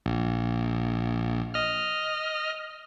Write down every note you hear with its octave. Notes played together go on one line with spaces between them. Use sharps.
A#1
D#5 F6